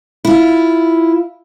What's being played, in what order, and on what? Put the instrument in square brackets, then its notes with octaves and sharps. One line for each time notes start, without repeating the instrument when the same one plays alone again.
[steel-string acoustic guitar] E4 F4